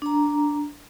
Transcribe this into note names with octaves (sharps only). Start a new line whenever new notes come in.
D4 A#5